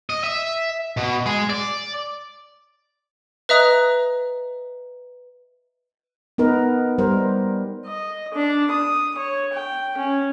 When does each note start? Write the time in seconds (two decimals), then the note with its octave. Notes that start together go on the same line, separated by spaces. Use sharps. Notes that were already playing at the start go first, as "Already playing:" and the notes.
0.10 D#5
0.24 E5
0.97 B2
1.26 G#3 G#4
1.50 D5
3.49 B4 D#5 E5 A#5 D#6 F#6
6.38 B3 D#4 A#4 B4
6.98 G3 A#4 C5
7.87 D#5
8.34 D4
8.71 D#6
9.18 C#5
9.53 G5
9.98 C#4